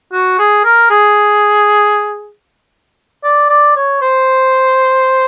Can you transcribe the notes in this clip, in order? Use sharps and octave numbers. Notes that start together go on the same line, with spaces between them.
F#4
G#4
A#4
G#4
D5
D5
C#5
C5